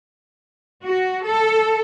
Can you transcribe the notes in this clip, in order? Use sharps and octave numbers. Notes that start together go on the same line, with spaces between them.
F#4
A4